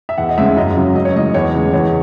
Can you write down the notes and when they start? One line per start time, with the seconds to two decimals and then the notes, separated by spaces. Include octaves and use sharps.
0.09 E5
0.18 E2 F#5
0.29 D#5
0.38 C#3 G#3 E5
0.56 F#2 D#5
0.76 C#3 F#3
0.96 F#2 D#5
1.05 C#5
1.15 E3 G#3 D#5
1.34 E2 C#5
1.54 C#3 E3 G#3
1.73 E2 C#5